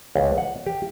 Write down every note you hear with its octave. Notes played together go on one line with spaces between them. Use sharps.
C#2
F#5
G4